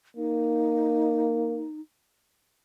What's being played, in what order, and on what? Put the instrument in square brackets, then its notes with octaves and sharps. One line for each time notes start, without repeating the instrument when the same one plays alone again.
[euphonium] A#3 [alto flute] D#4